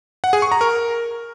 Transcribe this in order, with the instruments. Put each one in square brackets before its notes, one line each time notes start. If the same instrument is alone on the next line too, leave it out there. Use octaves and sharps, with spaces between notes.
[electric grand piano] F#5
G#4
C#6
A#5
A#4